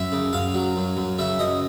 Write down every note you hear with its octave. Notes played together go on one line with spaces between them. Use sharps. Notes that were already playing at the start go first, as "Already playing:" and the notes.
Already playing: F#2 E5
C#3
F#2 F5
F#3
F#2
F#2
C#3 E5
F#2 D#5